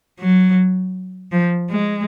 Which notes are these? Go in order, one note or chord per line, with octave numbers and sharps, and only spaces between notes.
F#3
F3
G#3